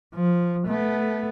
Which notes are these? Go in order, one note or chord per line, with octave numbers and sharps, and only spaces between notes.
F3
A3 B3